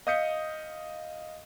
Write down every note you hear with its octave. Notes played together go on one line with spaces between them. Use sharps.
D#5 F5 D#6 G6 B6 C#7